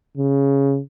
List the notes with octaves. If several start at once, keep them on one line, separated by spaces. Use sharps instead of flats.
C#3